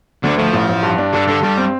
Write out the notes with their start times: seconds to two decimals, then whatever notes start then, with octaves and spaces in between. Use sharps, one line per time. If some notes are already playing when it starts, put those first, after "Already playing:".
0.23 D2 D3
0.38 F3 A3
0.53 A1
0.69 A1
0.83 G2
0.98 D4
1.13 G2 D3
1.28 D3 A4
1.43 G2 G3
1.58 C4